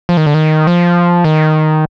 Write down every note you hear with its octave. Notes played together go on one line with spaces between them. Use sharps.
F3
D#3
D3
D#3
F3
D#3